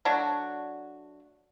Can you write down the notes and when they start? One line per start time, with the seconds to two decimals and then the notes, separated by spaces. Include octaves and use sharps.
0.05 F#3 A3 D4 F#4